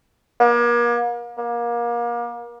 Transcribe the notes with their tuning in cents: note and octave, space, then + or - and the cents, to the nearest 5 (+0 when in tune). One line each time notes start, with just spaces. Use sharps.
A#3 +40
A#3 +30